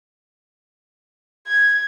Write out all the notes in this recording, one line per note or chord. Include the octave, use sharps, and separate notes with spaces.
G#6